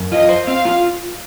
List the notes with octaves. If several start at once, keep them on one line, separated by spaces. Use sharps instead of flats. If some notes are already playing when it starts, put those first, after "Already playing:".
Already playing: F#2
F4 D#5
C5
C4 F5
F4